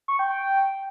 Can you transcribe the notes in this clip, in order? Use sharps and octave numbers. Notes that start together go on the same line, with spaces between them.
C#6
G5
G5